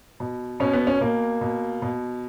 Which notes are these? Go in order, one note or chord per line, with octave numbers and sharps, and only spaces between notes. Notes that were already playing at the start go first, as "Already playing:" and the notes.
B2
B2 C#4
B3
C#4
B2 A#3
B2
B2